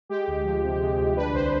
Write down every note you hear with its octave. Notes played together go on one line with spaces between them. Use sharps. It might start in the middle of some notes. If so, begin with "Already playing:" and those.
G#3 G4
D2
F3
C3
G#3
D2
D4 B4
C2 C5